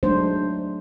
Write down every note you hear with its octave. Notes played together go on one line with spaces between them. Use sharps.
F#3 G#3 A3 D4 D#4 C5